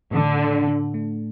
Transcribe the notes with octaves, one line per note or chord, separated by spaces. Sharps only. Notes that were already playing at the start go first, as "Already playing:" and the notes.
A2 D3
D4
D4
A3